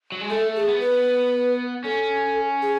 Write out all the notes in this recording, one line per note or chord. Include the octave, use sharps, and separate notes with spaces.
F#3
G#3
A3 A4
G#4
B3
B4
C#4 A4
G#4